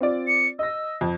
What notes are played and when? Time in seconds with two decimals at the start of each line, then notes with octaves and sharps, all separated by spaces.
0.01 C4 F4 D5
0.27 C#7
0.59 D#5 E6 A#6
1.01 F2